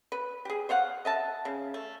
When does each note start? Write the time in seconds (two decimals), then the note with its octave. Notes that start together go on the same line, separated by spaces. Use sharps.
0.12 B4
0.45 G4 G#4
0.69 C5 C#5 F5 F#5
1.05 D#5 E5 A5
1.45 C#3
1.74 A3